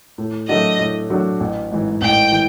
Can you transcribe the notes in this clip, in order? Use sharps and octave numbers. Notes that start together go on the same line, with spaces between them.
A2
F#3 A3 D4 F#4 D#5
A2
F#3 A3 D4 F#4
A1
G#2 E3
A1 G5
E3